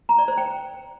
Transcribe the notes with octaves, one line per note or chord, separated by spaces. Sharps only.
A#5
D5
C5
G5